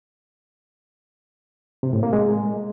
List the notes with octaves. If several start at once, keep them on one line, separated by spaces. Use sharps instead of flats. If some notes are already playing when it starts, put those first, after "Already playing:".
C3
A2
A#3
G#3